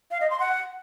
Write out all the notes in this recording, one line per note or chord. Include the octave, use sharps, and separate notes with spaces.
F5
D#5
C6
F#5